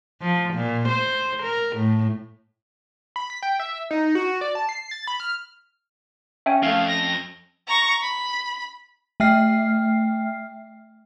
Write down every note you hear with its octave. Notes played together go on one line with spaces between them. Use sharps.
F3
A#2
C5
A#4
A2
B5
B6
G5
E5
D#4
F#4
D5
A5
C7
A6
B5
F6
C#4 E5 G5 G#5
F2 A3 C#4 F5
A#6
A#5 C#6
B5
A3 E5 G5 F6 C7